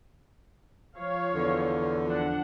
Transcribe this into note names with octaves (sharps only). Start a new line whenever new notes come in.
F3 C#5 F5
E2 D3
F3 D4 F#5